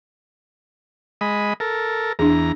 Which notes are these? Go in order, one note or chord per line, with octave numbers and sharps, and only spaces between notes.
G#3 D#5 B5
A4 A#4
E2 D4 G#4 A#5